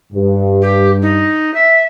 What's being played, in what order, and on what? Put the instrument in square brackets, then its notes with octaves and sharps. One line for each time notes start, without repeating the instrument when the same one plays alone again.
[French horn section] G2
[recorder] G4
D#4
E5